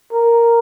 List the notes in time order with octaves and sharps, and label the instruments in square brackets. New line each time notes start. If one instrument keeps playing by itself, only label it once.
[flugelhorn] A#4